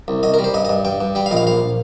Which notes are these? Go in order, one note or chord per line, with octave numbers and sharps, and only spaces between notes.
C2
C2 D#5
A#4
G3
C5
G2 D#5
D#5
G2
G2 G5
G2
G3 G5
F5
A#1 D#5
F5
A#1 F5